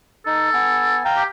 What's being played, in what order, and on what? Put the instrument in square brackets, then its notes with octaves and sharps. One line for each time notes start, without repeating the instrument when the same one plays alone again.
[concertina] D#4 [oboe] A4
[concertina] B3 G#5
F5 G5 A#5
[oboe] G4